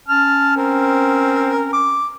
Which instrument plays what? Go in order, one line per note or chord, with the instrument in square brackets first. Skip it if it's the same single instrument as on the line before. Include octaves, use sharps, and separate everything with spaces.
[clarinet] C#4 [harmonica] A5 F6
[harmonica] C4 A#4
D6